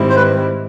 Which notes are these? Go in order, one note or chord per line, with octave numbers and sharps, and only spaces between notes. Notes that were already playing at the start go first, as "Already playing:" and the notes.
Already playing: G#2 D#3 G3 C4 E4
C5
B4